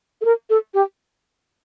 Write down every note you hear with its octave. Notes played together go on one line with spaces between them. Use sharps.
A4
A#4
A4
G4